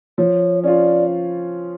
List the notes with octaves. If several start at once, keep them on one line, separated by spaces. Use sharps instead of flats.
F3 C#5
C#4 F4 D5